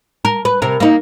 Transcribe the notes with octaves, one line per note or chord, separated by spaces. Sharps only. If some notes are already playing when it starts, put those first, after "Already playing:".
A#4
B4
C3 A#4
A#3 D#4